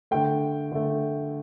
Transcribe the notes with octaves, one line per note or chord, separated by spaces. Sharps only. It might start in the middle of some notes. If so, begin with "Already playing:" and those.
D3 A3 G5
D3 A3